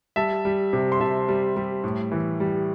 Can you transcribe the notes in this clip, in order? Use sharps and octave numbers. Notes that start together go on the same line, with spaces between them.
G3 E5 A5
G3
C3
C6
C3 E5 A5
G3
G3
A2
E3
G3